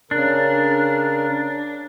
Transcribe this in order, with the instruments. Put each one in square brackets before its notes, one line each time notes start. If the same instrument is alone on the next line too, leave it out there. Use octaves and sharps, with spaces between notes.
[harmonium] C#3 A#4 [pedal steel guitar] D4